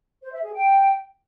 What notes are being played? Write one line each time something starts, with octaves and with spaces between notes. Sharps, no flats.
C5
E5
G#4
G5